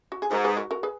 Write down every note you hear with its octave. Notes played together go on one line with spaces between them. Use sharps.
F#4
G#4
G#2 F#4 A#4
G#4 B4
F#4 A#4
F#4 A#4
G#4 B4